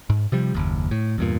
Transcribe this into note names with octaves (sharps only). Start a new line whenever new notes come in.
G#2
C3 F3 G3
F#1 D#2
A2
E2 G2 A#2